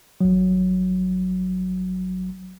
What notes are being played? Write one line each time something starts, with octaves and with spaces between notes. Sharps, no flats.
G#1 F#3